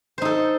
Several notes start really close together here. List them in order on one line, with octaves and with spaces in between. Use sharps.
C5 D#4 A4